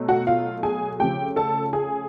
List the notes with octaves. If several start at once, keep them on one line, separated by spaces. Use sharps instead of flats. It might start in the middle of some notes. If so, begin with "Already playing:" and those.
Already playing: B2 F#3 A3
F#4 F#5
F4 F5
G#4 G#5
C#3 F3 A3 G4 G5
A4 A5
G#4 G#5